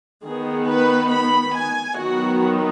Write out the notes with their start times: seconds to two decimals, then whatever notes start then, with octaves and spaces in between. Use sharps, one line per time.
0.24 D#3 B3 G#4
0.68 B4
1.11 B5
1.55 G#5
1.99 D#3 F#3 B3 F#4